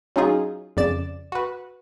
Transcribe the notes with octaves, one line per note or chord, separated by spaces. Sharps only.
F#3 C#4 D#4 F4 G#4
F2 C#3 D5 A6 E7
F#4 B4